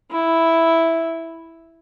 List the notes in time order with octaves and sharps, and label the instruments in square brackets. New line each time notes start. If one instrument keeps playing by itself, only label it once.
[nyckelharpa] E4